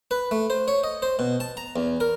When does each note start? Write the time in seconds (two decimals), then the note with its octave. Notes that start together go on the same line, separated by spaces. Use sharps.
0.11 B4
0.31 A3
0.50 C5
0.68 C#5
0.84 D#5
1.02 C5
1.19 B2
1.40 A5
1.57 A#5
1.76 E2
2.00 A#4